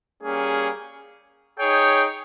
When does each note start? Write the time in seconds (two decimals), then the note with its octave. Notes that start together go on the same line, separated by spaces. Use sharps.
0.22 G3 A#3 C#4 G#4
1.58 D#4 G#4 C#5 G5